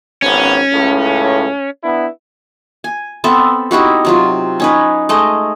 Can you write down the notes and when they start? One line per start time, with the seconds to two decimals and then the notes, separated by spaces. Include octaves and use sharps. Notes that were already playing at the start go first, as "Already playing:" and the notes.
0.22 G#1 F3 B3 C#4
0.72 C#2 A2
1.84 B3 D4 E4
2.84 G#5
3.24 B3 C4 A4 E5
3.71 D#4 E4 F#4 G4
4.05 C3 F#3 F4
4.60 C#4 D#4 B4
5.09 G#3 A3 D#5